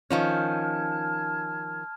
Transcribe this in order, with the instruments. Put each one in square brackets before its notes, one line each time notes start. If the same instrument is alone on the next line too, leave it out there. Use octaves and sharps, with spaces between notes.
[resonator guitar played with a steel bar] D#3 F3 C#4 [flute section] A5 F6 G#6